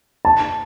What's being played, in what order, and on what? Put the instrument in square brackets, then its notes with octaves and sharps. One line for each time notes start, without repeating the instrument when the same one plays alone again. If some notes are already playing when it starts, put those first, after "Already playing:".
[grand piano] A5